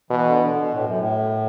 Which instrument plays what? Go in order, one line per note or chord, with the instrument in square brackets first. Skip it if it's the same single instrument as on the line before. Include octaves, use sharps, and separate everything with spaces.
[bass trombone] B2 [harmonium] E3
[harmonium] D3
E3
D3
B2
A2
F#2
A2